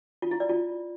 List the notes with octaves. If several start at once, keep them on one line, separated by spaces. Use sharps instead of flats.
F4
E4
D5
F4